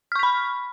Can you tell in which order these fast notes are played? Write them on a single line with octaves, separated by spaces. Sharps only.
F6 C#6 B6 B5